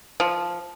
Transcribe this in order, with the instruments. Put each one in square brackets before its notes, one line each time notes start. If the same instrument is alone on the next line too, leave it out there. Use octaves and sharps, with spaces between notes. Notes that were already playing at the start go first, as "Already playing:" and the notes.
[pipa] F3